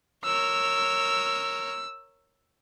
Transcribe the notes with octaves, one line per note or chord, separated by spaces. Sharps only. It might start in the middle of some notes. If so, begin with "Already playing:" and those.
A#4 C#5 E6